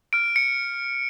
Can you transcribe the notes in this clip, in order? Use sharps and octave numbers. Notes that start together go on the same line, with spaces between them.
F6 D7
C#7